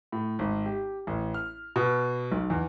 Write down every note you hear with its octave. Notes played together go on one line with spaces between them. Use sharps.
A2
G#1
G4
A1
F6
B2
B1
E2